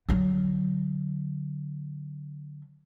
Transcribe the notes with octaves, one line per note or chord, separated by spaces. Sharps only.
D3 F#3